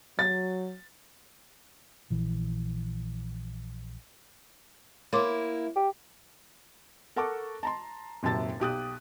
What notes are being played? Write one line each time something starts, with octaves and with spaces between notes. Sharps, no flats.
F#3 A6
A#1 E3
A#3 E4 C#5 C6 D6
G4
A4 A#4 F#5 A5 C#6 D6
A5 A#5 C6
D#1 F#2 C3 A5 A6
B1 G4 D#6 F#6